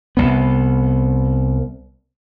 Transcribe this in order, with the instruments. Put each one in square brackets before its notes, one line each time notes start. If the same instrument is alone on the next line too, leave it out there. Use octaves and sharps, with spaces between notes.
[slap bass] C2 B3